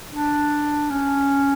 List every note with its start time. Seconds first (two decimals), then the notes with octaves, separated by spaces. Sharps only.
0.11 D4
0.90 C#4